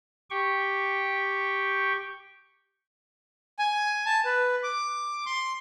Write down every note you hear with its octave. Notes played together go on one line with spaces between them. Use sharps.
G4 G5 C#6
G#5
A5
B4
D6
C6